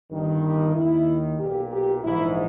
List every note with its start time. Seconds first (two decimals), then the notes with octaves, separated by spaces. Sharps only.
0.10 G1 G2 D#3
0.42 G4
0.74 D#2 D#3 E4
1.38 B1 A#2 G4
1.71 G4
2.03 A#1 G#2 E3 E4